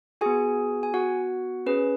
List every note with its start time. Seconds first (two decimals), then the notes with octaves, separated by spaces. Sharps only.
0.21 B3 F#4 G#4 G#5
0.83 G#5
0.94 F#4 F#5
1.66 C#4 G#4 B4